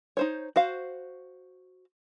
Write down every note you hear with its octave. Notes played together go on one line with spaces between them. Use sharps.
D#4 C5 C#5
F#4 C5 F5